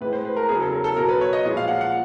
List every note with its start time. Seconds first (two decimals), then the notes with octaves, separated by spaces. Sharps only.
0.01 A2 E3 G#3 B4
0.13 C5
0.25 B4
0.37 A#4
0.49 E2 C#3 F#3 G#4
0.60 A4
0.73 A#4
0.84 A4
0.96 B2 A#4
1.00 F#3
1.09 B4
1.21 C#5
1.33 D#5
1.45 A#2 F3 G#3
1.57 F5
1.68 F#5
1.81 F#5